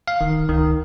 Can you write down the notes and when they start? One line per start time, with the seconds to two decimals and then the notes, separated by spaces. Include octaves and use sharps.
0.08 F5
0.21 D1 D#3
0.49 C#2 D#3